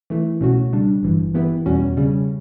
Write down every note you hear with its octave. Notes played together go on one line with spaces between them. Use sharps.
E3 A3 E4
C#2 B2 A3 C#4 F#4
C#3 G3 D4
G1 G2 E3
E3 B3 E4 G4 B4
E2 B2 G3 C#4 F#4
C#3 G3 C#4